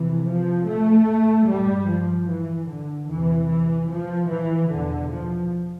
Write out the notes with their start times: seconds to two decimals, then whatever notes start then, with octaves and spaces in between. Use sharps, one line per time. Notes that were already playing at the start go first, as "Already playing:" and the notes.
Already playing: F2 C3 E3
0.27 F3
0.68 A3
1.48 G2 G3
1.89 F3
2.29 E3
2.68 D3
3.09 E2 C3 E3
3.49 E3
3.90 F3
4.29 E3
4.70 E2 B2 D3
5.10 F3